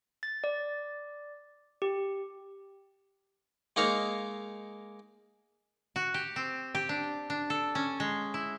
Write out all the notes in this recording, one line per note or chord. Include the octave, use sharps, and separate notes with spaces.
A6
D5
G4
G#3 A#3 D#4 C#5 F5
F#4
G4
C4
G4
D4
D4
A4
C#4
G#3
E4